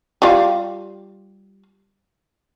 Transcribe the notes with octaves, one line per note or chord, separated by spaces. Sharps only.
G3 F4 F5